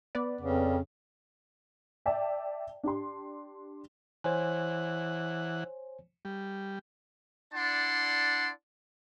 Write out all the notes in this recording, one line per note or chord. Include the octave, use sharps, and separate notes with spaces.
B3 B4 D5
F2 C#3
D5 E5 G5 A5
D4 G4 C6
E3 C5 C#5 F#5 G#5
G3
D4 E4 D5 F#5 A5 C6